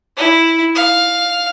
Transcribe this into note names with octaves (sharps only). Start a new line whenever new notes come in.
E4
F5